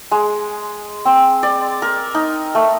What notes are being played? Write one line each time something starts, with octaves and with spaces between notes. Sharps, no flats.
G#3
C4
D5
A#4
D#4
A3